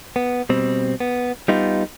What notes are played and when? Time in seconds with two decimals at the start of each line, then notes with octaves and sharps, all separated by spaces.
0.16 B3
0.49 B2 G3 C4
1.00 B3
1.48 G3 B3 D#4 F4